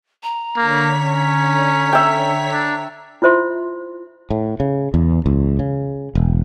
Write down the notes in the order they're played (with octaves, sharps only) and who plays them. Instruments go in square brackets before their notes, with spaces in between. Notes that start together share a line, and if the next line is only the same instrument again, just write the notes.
[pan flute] A#5
[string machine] D3 C#5 B6 [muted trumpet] A#3
[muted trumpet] C#4
[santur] E5 G5
[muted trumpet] D4
[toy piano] E4 F4 C5 E5 C6
[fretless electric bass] A2
C#3
E2
C#2
C#3
E1